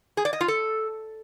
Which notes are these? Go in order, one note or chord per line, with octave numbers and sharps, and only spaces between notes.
G#4
D5
D#5
F4
A4